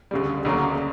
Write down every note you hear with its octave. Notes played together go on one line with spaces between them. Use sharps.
D2 C#3 G3
D2 C#3 F#3 A#3